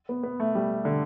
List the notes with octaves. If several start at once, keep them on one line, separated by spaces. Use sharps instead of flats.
B3
B3
A3
G3
D3